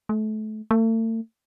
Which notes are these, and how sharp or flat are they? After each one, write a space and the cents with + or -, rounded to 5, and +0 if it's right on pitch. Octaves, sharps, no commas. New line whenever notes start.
A3 -30
A3 +40